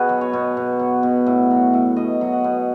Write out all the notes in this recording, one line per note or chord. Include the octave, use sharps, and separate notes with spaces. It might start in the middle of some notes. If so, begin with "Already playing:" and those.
Already playing: B2 F#4 G#4 B4
F#3
C#5
B2
B2
F#3
B2
A2
F#3
A2
B2 D#5
F#3
F#5
B2